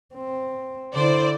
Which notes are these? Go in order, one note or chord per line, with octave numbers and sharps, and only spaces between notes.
C4
D3 E4 C5 D5